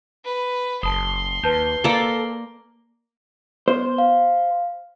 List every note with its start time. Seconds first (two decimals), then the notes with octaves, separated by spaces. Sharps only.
0.24 B4
0.83 F#1 A5 C6 D#6
1.43 D#2 B4 A5 G6
1.84 A#3 A4 D5
3.68 B3 C5
3.98 F5